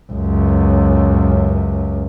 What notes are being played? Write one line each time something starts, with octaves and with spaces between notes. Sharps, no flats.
C#2 F#2